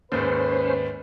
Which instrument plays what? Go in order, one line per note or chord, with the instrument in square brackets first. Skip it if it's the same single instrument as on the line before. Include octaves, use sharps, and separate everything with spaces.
[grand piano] D#2 G#2 [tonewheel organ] C#4 C5 [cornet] B4